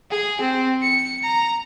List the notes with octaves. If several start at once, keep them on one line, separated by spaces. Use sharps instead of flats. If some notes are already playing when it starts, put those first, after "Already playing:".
G#4
C4
C#7
A#5